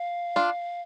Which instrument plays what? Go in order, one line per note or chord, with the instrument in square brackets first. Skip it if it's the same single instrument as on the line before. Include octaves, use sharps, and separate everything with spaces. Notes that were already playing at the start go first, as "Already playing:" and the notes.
Already playing: [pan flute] F5
[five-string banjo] D4 F4